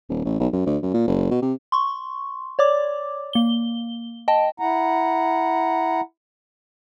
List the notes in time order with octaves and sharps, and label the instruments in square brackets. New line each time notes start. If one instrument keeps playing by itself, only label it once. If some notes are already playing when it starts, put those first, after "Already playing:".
[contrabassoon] D#1
A1
B1
F#2
D2
F#2
A#2
F#1
B2
C3
[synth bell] C6 C#6
C#5 D5 D6
A#3 G7
D#5 G5 A5
[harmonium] E4 F#5 A#5